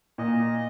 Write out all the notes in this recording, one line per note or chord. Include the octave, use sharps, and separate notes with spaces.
A#2 D#5